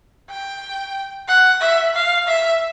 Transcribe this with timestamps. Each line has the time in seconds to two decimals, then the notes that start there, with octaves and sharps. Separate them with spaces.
0.30 G5
1.28 F#5
1.61 E5
1.94 F5
2.28 E5